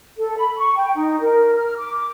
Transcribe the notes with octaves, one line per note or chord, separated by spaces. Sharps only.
A4
B5
C#6
G5
D#4
A#4
F6
D6